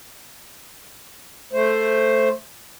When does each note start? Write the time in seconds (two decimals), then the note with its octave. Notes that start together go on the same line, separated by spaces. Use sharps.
1.53 A3 C5